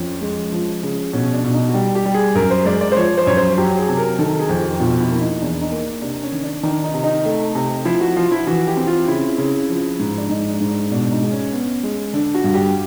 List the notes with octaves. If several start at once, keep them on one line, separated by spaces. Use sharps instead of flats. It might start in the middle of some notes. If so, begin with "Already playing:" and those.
Already playing: F2 F3 C#4
G#3
F3
C#3
B2 C#4
D4
B2
D#4
F#4
G3 G4
G4
G3
G#4
F#2 A#4
C5
G#3 D5
D5
C5
F3 C#5
C5
F#2 C#5
C5
F#3 G4
G#4
C3
A#4
D#3 A4
G#4
F2
G4
B2 F4
E4
A#3 E4
D#4
E2 D4
D#4
A#3
C3 D4
C#4
D#3
D4
D#3 D4
D#4
C3
D#4
A3
C3
F3 E4
F#4
F3 F4
E4
E3 F#4
G4
C4
F4
C#3 E4
C#3
F3
G#2
D4
G#2 D#4
D4
G#2
D4
B2 D4
D#4
G#3
C#4
B3
G#3
D3 D4
F#4
G2
G4